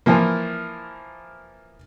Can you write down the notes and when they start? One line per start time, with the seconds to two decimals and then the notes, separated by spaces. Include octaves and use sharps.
0.06 E3 F3 A#3